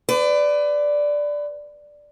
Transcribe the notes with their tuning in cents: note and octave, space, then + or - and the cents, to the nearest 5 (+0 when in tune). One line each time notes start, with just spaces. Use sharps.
B4 +30 D5 +0